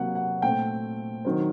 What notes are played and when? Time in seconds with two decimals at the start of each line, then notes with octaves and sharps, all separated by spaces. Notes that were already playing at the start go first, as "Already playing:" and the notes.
Already playing: C3 F#3 A#3 F#5
0.15 F#5
0.42 A#2 A3 C4 G5
1.25 D#3 F#3 C4